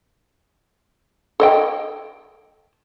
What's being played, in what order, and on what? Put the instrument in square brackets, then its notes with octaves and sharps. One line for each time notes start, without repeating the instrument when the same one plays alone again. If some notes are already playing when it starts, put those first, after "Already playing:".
[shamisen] A4 D#5 G5